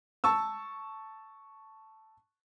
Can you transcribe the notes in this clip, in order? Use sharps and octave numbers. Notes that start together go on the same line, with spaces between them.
A5 C#6 E6